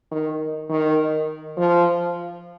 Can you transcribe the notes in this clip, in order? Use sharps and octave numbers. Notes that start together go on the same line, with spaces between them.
D#3
D#3
F3